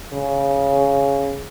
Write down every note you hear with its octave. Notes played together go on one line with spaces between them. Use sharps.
C#3